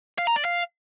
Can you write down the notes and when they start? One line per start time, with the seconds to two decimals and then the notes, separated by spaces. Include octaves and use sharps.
0.18 F5
0.27 A#5
0.36 D5
0.45 F5